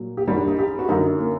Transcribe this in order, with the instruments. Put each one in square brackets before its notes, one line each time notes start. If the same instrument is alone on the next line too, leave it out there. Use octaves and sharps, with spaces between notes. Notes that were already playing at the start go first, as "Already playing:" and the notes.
Already playing: [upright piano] A#2 F#3
G4
F#2 D#3 G3 F#4
D4
D#4
G4
F#4
F#2 D3 F#3 D#4
A#3